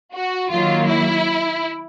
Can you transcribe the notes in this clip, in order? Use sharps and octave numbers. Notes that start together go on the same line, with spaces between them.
F#4
D#3 F#3 A#3 F4
E4